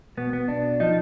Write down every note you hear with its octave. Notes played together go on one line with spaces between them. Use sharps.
B2 B3
B3
B2 D4
F3 D#4